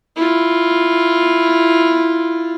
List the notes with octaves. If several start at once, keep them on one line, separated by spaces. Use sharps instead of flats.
E4 F4